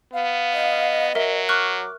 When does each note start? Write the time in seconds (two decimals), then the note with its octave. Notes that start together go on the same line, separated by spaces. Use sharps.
0.13 B3 F5
0.53 D#5
1.15 F#3 A#4 E5
1.49 C#6 D6 F6 F#6